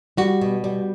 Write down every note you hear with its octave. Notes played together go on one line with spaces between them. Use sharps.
G3 F#4
B2
G3